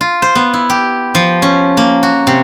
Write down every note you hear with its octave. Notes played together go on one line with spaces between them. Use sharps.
F4
C5
B3
E4
G4
F3
C#4
A#3
F#4
C3